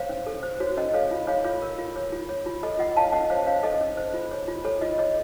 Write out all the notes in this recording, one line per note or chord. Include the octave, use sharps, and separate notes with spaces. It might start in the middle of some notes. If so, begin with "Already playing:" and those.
Already playing: C5 C#5 F5
C#4
A4
C5
F#4 C#5
C#4 D#5
A4 C#5 F5
F4
C#5 F5
F4 C#5
A#4
F4
C#5
F4
C#5
F4
A4 D#5
F4 D#5 F#5
C#5 F5 A5
C#4 D#5 F#5
C5 C#5 F5
C#4 C#5 F5
A4 D#5
C#4
C5
F4
C#5
F4
A4 C#5
F4 D#5
C#5 D#5